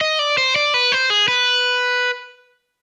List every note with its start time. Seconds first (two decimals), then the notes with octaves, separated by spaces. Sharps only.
0.01 D#5
0.19 D5
0.38 C5
0.56 D5
0.74 B4
0.92 C5
1.10 G#4
1.28 B4